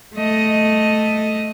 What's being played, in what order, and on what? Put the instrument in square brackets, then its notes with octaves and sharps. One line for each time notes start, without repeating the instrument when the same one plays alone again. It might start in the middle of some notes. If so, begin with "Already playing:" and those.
[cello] A3 D#5